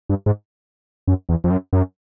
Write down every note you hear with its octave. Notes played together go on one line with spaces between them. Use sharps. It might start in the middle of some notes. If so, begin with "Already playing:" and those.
G2
G#2
F#2
E2
F2
F#2
F#2